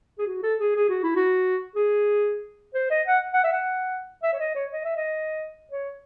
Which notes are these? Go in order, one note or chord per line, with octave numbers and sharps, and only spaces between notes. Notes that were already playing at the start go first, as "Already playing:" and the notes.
G#4
F#4
A4
G#4
G#4
F#4
E4
F#4
G#4
C5
D#5
F#5
F#5
E5
F#5
E5
C#5
D#5
C#5
D#5
E5
D#5
C#5